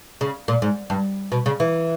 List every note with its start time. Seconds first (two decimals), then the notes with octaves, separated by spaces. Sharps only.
0.21 C#3
0.48 A#2
0.62 G#2
0.90 G2
1.32 B2
1.46 C#3
1.60 E3